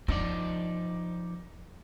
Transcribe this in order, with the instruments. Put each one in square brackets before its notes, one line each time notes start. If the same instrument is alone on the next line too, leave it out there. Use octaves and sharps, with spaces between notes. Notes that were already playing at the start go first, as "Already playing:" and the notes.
[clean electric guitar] F3 D#4 D5 [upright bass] D4